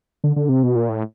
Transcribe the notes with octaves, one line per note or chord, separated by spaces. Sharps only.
D3
D3
C3
B2
A#2
A2